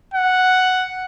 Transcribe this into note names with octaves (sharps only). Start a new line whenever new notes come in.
F#5